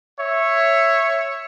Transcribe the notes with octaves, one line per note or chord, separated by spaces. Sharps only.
C#5 E5